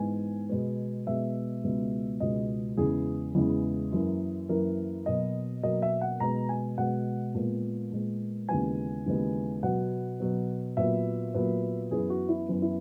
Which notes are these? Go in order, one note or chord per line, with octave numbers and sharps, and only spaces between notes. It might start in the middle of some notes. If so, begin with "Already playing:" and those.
Already playing: G#2 E3 B3 G#5
B2 G#3 B3
B2 G#3 B3 E5
C#2 B2 G#3 B3
C#2 B2 G#3 B3 D#5
E2 C#3 E3 G#3 G#4
E2 C#3 E3 G#3
F#2 E3 A#3
F#2 E3 A#3 A#4
B2 F#3 A#3 D#5
B2 F#3 A#3 D#5
E5
F#5
B2 G#3 B3 A#5
G#5
B2 G#3 B3 F#5
A#2 G#3 B3
A#2 G#3 B3
D#2 C#3 E3 G#3 B3 G#5
D#2 C#3 E3 G#3 B3
B2 F#3 B3 F#5
B2 F#3 B3
A#2 F#3 B3 E5
A#2 F#3 B3
F#2 E3 B3 G#4
F#4
E4
F#2 E3 B3
E4